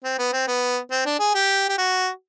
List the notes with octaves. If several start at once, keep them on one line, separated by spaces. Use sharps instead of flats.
C4
B3
C4
B3
C4
D4
G#4
G4
G4
F#4